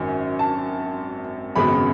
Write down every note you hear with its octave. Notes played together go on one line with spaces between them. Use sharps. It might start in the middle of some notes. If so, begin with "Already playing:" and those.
Already playing: G#1 F#2 D#3 G#5
A5
G#1 F#2 C#3 G#3 B3 B5